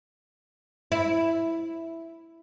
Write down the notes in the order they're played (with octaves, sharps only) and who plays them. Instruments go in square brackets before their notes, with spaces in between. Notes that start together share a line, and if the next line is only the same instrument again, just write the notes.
[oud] E4